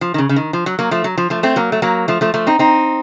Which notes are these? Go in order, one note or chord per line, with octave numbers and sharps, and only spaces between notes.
F3
D#3
C#3
C#3
D#3
F3
F#3
F#3 A#3
F3 A3
F#3
F3
F3 A3
A3 C4
F#3 A#3
A3
F#3 A#3
F3 A3
F3 A3
F3 A3
C4 D#4
C4 D#4